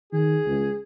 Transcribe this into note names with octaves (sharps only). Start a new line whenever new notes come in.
D#3 G#4
C#2